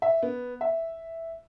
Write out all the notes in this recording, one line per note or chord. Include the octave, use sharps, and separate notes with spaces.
E5
B3
E5